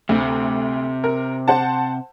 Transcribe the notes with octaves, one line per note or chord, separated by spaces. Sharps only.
D2 C3
A#4
C5 F#5 A5